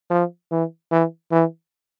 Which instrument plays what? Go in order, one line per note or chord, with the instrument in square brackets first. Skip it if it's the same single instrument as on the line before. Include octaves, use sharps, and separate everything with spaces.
[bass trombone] F3
E3
E3
E3